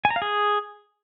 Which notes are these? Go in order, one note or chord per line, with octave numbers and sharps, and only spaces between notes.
G#5
A#5
F5
G#4